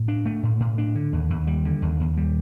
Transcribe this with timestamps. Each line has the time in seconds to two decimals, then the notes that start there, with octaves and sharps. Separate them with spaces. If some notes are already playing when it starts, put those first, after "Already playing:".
Already playing: A2
0.08 D4
0.26 A3
0.43 A2
0.60 A2
0.78 D4
0.95 D3
1.13 D#2
1.30 D#2
1.47 G3
1.65 D3
1.82 D#2
2.00 D#2
2.17 G3